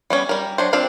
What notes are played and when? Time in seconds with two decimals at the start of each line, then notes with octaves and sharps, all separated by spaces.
0.10 G3 B3 C#4
0.29 G3 A#4
0.58 F#3 D4 C5
0.73 C4 D4 F4 F5